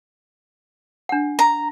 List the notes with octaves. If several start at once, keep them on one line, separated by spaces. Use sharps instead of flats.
D4 F#5
A#5